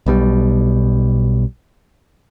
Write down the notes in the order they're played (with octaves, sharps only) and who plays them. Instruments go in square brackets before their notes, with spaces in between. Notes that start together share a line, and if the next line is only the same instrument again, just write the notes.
[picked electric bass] B1 B2 G3